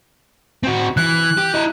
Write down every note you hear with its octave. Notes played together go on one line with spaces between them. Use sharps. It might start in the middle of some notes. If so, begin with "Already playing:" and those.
C4 F#4
E3 F#6
G4
E4 D#5